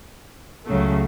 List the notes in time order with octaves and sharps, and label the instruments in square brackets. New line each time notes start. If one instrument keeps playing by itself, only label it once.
[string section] C#2 C#3 F#3 A3